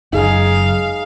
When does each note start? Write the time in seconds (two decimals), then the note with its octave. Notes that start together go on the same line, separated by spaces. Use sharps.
0.13 F#1 F#2 D#4 G#4 F5